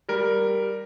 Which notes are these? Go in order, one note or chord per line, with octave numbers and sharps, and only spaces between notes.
G3 A#4